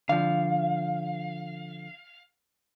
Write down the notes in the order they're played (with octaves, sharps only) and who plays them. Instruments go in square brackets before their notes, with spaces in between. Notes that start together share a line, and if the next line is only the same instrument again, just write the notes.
[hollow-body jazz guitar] D3 F3 [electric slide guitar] F5